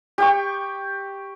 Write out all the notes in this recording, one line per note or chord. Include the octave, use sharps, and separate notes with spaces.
G4 G5 C#6